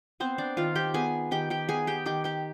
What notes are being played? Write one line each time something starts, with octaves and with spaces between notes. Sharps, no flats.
B3 C4 C5
D4 D5
D#3 F4 F5
G4 G5
B3 G#4 G#5
D#3 G4 G5
G4 G5
B3 G#4 G#5
G4 G5
D#3 G4 G5
G4 G5